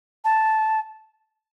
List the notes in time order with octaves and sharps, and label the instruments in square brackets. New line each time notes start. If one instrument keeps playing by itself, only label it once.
[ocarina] A5